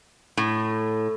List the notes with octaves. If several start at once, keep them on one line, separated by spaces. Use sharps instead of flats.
A2